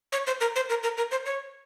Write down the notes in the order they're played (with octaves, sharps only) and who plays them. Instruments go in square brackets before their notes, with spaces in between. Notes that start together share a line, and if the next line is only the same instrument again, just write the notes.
[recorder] C#5
C5
A#4
C5
A#4
A#4
A#4
C5
C#5